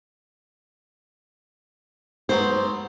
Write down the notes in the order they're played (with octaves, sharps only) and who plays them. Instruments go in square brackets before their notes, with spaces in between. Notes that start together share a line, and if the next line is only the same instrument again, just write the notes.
[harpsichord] G#2 F#3 B3 [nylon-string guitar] C5